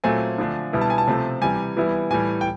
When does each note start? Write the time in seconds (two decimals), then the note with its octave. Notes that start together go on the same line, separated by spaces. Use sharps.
0.04 A#2 F#3 A3 C4 G#5
0.38 D3 F3 A3 D4
0.73 B2 G3 B3 E4
0.81 A5
0.90 G#5
0.98 A5
1.08 C3 F3 A3 C4
1.41 C3 E3 G3 G#5
1.77 E3 G3 B3 E4
2.10 A2 E3 G3 G#5
2.41 G5